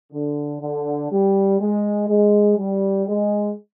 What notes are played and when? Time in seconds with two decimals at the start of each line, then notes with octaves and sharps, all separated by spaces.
0.13 D3
0.62 D3
1.11 G3
1.60 G#3
2.09 G#3
2.57 G3
3.07 G#3